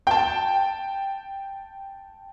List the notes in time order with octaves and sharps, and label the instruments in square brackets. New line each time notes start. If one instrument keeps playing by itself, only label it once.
[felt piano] G5 A5